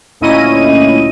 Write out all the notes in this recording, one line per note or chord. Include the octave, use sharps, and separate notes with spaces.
D2 A#2 C#4 E4 D#5 D#7